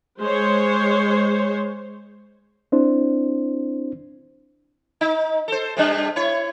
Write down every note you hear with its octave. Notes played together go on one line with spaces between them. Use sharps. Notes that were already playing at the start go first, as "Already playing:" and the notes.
G#3 C5 C#5
C4 D4 E4 C5
D#4
A4 C5
C3 G3 D4
E4 C#5